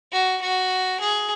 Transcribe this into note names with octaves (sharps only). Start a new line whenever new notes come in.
F#4
F#4
G#4